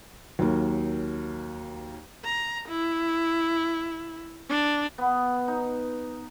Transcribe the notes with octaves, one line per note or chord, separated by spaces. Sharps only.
D#2 F#3 A#3
A#5
E4
D4
B3
D#4